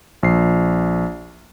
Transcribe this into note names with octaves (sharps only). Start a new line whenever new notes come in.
A#1 C7